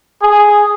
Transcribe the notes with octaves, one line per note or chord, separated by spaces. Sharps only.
G#4